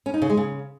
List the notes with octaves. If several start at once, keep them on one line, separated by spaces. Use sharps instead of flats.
C#4
D#4
C#3
G#3
C#3